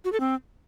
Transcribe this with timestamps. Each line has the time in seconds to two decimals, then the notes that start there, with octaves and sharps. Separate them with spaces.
0.05 F#4
0.12 A4
0.20 C4